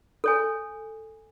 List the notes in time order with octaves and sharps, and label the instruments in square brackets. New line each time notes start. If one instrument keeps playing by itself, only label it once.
[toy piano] A4 C#5 G#5